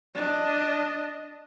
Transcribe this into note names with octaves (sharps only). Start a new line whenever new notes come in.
D4 D#5